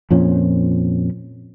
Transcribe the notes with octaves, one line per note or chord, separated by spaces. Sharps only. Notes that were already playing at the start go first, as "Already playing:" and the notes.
F2 A#2 F3 C#4